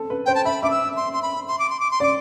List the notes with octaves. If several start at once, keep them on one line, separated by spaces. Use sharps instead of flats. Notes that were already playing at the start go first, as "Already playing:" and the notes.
Already playing: C4 A4
B4
C5 G5
A5
E5 B5
E5 D6
E6
C6
C6
B5
C6
D6
C6
D6
C6
D5 D6